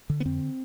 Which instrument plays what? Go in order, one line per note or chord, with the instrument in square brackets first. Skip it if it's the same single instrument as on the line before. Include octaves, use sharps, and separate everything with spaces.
[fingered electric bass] D3
B3
F2 C4